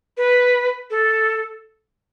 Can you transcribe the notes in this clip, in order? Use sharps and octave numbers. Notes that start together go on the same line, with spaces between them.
B4
A4